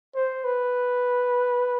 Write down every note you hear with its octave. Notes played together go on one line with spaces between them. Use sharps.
C5
B4